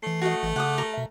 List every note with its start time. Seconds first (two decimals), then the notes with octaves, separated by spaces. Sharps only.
0.03 E3 A3 C7
0.21 A3 F#4 D#5
0.43 G#1 E3
0.56 C#3 F#5 D6 D#6
0.78 A#4
0.94 B2 E5